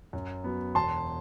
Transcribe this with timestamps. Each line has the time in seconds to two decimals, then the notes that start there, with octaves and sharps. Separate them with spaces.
0.13 F#2
0.44 F#3 B3
0.75 E1 A5 C6